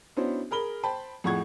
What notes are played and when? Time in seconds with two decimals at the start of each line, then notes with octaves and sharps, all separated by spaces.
0.17 B3 C#4 D4 E4 F#4 C5
0.51 G#4 A#4 B5 G7
0.83 C5 G5 A5 B5
1.24 F2 A2 G#4 F#5 C#6 G#6